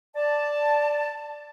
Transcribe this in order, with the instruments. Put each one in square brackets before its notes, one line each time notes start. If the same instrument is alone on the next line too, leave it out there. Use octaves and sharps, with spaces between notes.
[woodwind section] D5 A5